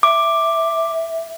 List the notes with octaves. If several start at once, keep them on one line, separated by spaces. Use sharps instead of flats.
E5 D6